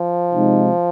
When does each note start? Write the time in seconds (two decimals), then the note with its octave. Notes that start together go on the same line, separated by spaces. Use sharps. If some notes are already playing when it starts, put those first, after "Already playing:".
Already playing: F3
0.34 C3 G#3 D#4